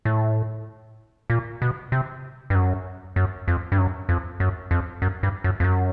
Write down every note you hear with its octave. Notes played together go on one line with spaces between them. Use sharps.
A2
A#2
B2
C3
G2
F#2
F#2
F2
G2
F#2
F2
F#2
F2
F#2
G2
F#2
F2
F#2